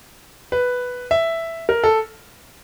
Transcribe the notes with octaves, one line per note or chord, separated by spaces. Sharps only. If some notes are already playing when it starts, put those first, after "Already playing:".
B4
E5
A#4
A4